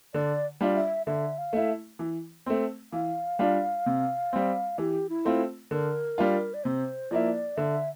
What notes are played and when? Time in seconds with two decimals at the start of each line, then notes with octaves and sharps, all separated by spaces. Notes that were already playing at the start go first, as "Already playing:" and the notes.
0.14 D3 D5
0.61 G3 D4 F4
0.75 E5
1.06 D3 E5
1.38 F5
1.53 A3 E4
1.99 E3
2.46 A3 C4
2.92 E3 F5
3.39 G3 D4 F4
3.86 C3
4.33 G3 C4
4.78 E3 G4
5.09 E4
5.25 A3 C4 F4
5.71 D3 A#4
6.18 G3 D4 F4
6.54 D5
6.64 C3 C5
7.11 F3 A#3 E4 D5
7.57 D3 E5